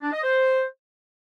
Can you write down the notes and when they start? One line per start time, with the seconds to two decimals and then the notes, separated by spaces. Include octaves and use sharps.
0.02 D4
0.13 D#5
0.23 C5